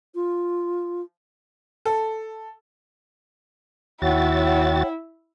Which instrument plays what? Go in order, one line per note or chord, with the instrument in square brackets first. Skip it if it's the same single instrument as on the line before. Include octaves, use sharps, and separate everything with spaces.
[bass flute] F4
[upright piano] A4
[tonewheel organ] D#2 F#4 A6 [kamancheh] E4 [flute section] C#5 F#5 G5